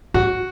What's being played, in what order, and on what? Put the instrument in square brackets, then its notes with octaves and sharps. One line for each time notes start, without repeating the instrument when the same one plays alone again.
[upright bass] G#2 [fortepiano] F#4